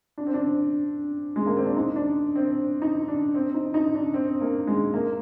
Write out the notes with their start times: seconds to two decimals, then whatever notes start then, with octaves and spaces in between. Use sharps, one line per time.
0.18 D4
0.26 C4
0.34 D4
1.36 G#3
1.46 A#3
1.56 C4
1.66 D4
1.76 D#4
1.96 D4
2.36 C4
2.82 D#4
3.08 D4
3.34 C4
3.54 D#4
3.74 D#4
3.95 D4
4.14 C4
4.41 A#3
4.67 G#3
4.94 A#3